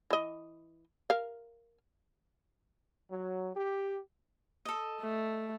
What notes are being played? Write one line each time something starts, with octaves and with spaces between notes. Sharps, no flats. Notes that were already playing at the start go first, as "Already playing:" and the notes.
E3 D#5
A#4 F5
F#3
G4
A4 D#5
A3